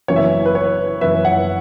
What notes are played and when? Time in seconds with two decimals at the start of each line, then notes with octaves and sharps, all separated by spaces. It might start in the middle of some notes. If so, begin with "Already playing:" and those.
0.08 F#1 F#2 E3 C#4 C#5
0.16 E5
0.24 C#5
0.46 B4
0.55 C#5
1.01 F#1 F#2 E3 C#4 B4 E5
1.25 C#5 F#5